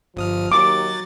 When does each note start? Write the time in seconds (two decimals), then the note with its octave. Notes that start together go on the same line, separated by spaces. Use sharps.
0.16 G1 F3 D#6 F6
0.52 D#2 F#3 D6 A6